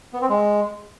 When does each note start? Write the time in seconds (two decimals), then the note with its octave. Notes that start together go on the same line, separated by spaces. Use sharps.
0.13 B3
0.21 C4
0.29 G#3